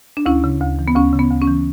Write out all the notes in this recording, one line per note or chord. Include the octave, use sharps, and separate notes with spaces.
D4
D2 C#4 E4
C#3
D2
E3
B3
D2 C#4
C#3
B3
D2
C#4
E3